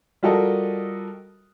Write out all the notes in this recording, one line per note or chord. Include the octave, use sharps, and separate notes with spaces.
G3 F4 F#4 A4 A#4 D#5